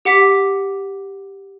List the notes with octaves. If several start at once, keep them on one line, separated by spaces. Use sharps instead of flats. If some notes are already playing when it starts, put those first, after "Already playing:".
G4 F#5 D6 B6